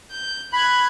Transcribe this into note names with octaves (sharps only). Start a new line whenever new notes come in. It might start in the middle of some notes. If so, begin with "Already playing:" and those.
G6
B5 F#6 G#6